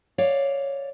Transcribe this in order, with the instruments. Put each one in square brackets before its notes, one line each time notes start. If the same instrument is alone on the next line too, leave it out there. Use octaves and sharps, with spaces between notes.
[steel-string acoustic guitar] C#5 D5 F5